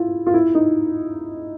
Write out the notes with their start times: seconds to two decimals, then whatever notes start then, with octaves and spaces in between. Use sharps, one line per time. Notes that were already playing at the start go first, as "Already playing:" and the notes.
Already playing: E4 F4
0.26 F4
0.34 E4
0.55 D#4